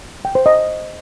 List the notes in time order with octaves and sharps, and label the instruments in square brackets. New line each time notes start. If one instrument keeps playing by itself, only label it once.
[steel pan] G5
C5
D#5